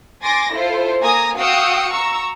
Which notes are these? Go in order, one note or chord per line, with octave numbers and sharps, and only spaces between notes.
G#5 C6 D6 A6 A#6
E4 F4 A4 C5
A#3 G#5 A#5 D#6 A#6
F#4 F5 G5 D#6 E6 C#7
A#5 C#6 E6